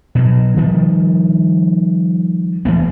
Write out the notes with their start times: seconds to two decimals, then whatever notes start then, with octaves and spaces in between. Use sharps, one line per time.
0.15 B2 F#3
0.57 D#3 F3 G3
2.65 D#1 E3 A3 B3